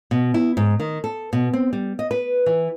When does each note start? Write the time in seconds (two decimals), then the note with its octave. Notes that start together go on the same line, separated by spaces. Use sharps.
0.11 B2
0.34 E4
0.57 G#2
0.80 D#3
1.04 A4
1.33 B2
1.53 C4
1.73 G3
1.99 D#5
2.11 B4
2.46 E3